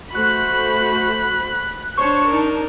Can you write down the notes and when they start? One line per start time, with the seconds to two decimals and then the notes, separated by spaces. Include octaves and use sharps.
0.15 A3 F#4 C5 B5 F#6
1.98 D4 C5 C#5 A5 C#6
2.27 D#4 A#4